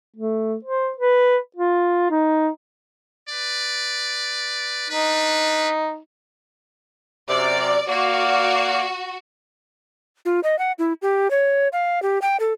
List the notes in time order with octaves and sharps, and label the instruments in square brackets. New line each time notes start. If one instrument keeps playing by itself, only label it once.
[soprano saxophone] A3
C5
B4
F4
D#4
[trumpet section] B4 D5
[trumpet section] D4 B4 [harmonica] D#4
[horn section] F#2 C3 A#4 [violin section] D5
[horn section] A#3 D5 F5 [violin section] F#4
[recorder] F4
D#5
F#5
E4
G4
C#5
F5
G4
G5
A4